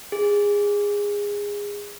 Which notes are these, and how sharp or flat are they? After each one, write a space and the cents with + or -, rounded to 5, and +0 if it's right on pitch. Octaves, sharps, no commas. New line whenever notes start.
G#4 -20